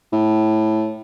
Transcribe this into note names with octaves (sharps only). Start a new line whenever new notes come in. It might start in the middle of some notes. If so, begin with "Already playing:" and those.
A2